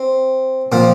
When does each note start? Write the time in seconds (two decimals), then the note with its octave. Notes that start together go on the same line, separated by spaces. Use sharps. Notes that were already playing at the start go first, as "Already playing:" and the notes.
Already playing: C4
0.72 A#2 F3 C4